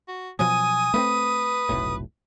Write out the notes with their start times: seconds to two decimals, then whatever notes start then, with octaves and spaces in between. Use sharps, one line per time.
0.08 F#4
0.39 B2 F3 F#3 G#5 D#6
0.94 A3 A#3 C4 B4
1.69 F1 B1 A2